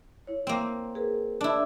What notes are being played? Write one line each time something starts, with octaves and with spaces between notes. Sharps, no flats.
E4 C#5
A#3 C4
G#4 A#4 B4
D4 E4